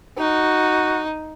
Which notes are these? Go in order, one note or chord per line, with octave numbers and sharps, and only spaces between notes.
D#4 F#4